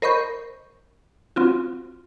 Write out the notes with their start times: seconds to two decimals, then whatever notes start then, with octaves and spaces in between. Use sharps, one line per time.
0.02 A#4 C5 D#5 B5 C#6 G6
1.36 C4 F4 F#4